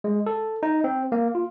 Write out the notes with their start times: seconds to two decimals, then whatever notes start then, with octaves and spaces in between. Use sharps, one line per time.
0.04 G#3
0.26 A4
0.63 D#4
0.84 C4
1.12 A#3
1.35 F4